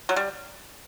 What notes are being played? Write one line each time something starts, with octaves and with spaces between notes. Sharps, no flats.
F#3
G3